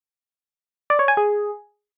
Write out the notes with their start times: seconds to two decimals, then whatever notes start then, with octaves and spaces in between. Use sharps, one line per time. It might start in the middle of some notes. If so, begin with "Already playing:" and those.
0.90 D5
0.99 C#5
1.08 G#5
1.17 G#4